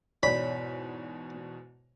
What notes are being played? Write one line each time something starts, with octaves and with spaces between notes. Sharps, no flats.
E2 G#2 B2 C#5 D5 B5